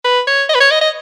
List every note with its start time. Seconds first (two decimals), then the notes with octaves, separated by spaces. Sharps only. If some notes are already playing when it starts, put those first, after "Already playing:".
0.04 B4
0.27 C#5
0.49 D#5
0.55 B4
0.60 C#5
0.71 D#5
0.82 D#5